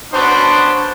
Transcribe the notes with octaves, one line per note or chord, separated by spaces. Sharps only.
B3 C#4 D4 F#4 C5